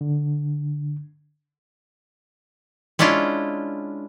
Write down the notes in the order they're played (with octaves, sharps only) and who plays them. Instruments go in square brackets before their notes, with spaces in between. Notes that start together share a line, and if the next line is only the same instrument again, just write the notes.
[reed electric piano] D3
[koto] G#3 C#4 D4 E4 F4